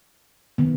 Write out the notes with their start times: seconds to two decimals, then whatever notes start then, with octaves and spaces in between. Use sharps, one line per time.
0.58 D#3 B3